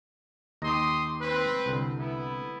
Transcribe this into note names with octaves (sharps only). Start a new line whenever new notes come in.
D#2 G4 D#5 A#5 C6 D#6
C4 B4
C2 D3
B3 E4